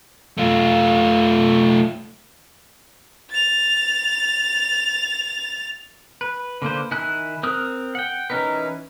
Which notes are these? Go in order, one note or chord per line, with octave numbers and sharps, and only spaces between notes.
A3 F4
A6 F7
B4
D3 A#3 B4 C5
D#3 E4 G#5 F#6
C4 A#4 D#6 F#6
F#5 G5
E3 C#4 D#4 A#4 B4